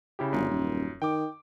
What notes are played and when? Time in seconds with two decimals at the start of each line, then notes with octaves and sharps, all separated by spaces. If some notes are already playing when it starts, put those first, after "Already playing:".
0.19 C#3 E4 G4
0.33 G1 F#2
0.48 D#1
1.02 D#3 G5 D6